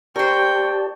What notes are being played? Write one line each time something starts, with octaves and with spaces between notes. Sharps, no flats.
G4 A#4 C5 D5 G5 A5 C#6